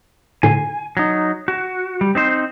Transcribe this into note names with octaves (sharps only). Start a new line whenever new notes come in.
A2 D3 G#5 C7
F#3 D#4
F#4
G3
C4 D#4 C5